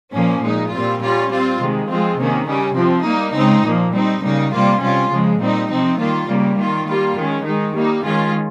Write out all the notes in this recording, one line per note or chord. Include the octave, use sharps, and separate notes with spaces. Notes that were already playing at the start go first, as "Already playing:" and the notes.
A#2 F3 A#3 C#4
A#2 G#3 D#4
A#2 G3 C4 F4
G3 C#4 F4
G3 C4 F4
C3 D#3 G#3
F3 G#3 C4 F4
C3 D#3 A#3 C#4
C#3 G3 C#4
C3 F3 C4
G3 A#3 D#4
C#3 G#3 C4 D#4
A#2 F3 A#3
G3 C4 D#4
C#3 G3 A#3 D#4
C3 G3 A#3 F4
C3 G3 C#4 F4
C#3 F3 G#3
A#2 G3 C4 D#4
C3 F3 C4 D#4
D#3 G3 A#3 F4
C#3 G3 A#3
D#3 A#3 F4
G3 A#3 F4
D#3 G#3 C#4
D#3 G#3 D#4
G3 A#3 D#4
D#3 G#3 C#4 F4